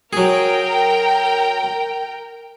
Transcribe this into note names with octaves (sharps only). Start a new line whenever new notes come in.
F#3 G#4 A#4 G5